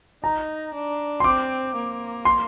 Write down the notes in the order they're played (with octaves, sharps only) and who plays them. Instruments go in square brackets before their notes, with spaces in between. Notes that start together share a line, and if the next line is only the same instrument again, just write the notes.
[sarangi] D#4 [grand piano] A#5
[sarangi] D4
[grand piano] C6
[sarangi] C4 [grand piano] D6
[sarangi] A#3
[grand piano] C6